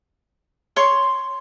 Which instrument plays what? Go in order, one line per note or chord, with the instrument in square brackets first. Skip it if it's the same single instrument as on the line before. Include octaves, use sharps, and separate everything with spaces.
[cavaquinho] C#5 C6 C#6